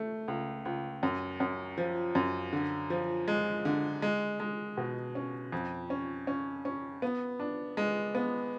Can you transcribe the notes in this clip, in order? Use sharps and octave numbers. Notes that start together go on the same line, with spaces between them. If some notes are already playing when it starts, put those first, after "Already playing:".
Already playing: A3
C#2
C#2
F#2
F#2
F3
F#2
D3
F3
G#3
D3
G#3
G#3
B2
C#4
F2
C#4
C#4
C#4
B3
D4
G#3
B3